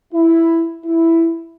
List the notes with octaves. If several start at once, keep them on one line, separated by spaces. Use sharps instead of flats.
E4
E4